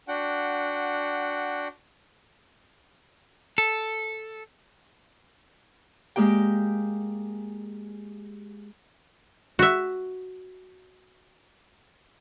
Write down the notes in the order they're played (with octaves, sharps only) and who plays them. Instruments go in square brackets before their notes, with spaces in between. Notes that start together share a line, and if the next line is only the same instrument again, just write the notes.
[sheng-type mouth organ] D4 F#4 F#5 G5
[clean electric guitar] A4
[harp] G#3 A#3 G4 G5
[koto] F#4 E5